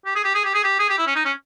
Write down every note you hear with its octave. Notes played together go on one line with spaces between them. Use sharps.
G4
G#4
G4
G#4
G4
G#4
G4
G#4
G4
E4
C#4
D#4
C#4